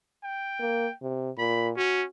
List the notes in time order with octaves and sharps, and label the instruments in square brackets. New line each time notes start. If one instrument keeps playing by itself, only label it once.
[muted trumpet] G5
[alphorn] A#3
C3
[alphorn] A#2 [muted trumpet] B5
[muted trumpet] C#4 [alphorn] F#4